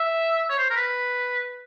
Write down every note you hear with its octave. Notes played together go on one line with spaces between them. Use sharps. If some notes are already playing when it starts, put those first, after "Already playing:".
Already playing: E5
C#5
C5
A#4
B4